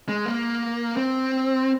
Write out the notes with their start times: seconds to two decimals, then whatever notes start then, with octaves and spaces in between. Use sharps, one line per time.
0.09 G#3
0.26 A#3
0.97 C4